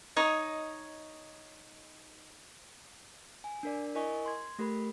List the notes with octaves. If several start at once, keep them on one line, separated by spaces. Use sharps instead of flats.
D#4 C#5 D#5
G#5
D4 A#4 D5
E4 A#4 D#5 G#5 C#6
C6 G#6
A3 G4 A#4 B5